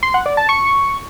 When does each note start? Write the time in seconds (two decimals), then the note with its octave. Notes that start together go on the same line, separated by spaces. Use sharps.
0.03 C6
0.14 F#5
0.26 D5
0.37 A5
0.49 C#6